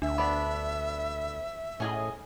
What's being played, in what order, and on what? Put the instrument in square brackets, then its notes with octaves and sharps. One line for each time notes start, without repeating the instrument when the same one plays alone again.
[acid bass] D2 [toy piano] D4 [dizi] E5
[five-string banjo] B3 D4 [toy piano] B5
[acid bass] A2 [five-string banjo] C#4 G#4 D#5